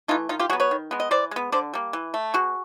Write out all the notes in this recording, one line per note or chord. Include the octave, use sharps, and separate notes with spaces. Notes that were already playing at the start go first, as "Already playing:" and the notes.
E3 A3 D#4 F4
D#3 D#4 F4
F4 G4
F#3 B3 F#4 G#4
B4 C#5
D#3
G#3 B3
D#5
E3 C5 D5
G#3 B3
D3 C5 D5
G3 A#3
E3
A3
B2 F#4 G#4